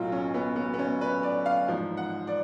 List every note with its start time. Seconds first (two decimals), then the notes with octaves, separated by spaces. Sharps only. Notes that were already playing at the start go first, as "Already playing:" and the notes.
Already playing: B1 A2 F#3 F4
0.12 C#4
0.34 B3
0.56 B3
0.74 B3
0.79 C#4
1.01 B4
1.23 D5
1.46 F5
1.68 A1 G#2 F3
1.97 F#5
2.27 D5